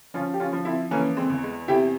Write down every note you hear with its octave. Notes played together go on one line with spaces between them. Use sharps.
F3 C#4 F4
G4
C#4 F4
F3
C4 E4
E3 A#3 C#4
G#3 C4
E2
G#3
C3 E4 G4